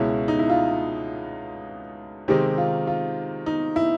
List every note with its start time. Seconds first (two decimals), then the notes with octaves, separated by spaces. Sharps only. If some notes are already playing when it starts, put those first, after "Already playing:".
Already playing: C#2 B2 G#3 C#4 E4
0.28 D#4
0.39 E4
0.50 F4
2.28 C3 D#3 G#3 C4 D#4 G4
2.58 F4
2.87 F4
3.46 D#4
3.76 E4